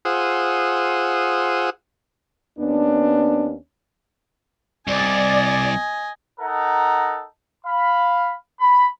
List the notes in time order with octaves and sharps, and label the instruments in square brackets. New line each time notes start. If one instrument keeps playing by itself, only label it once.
[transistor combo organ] F4 G#4 C5 F#5 D#6 E6
[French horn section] D#2 B3 C#4 D4
[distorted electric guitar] C2 [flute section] D5 [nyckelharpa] D#5 G#5
[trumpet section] D#4 A4 A#4 F#5 A#5
F5 B5
B5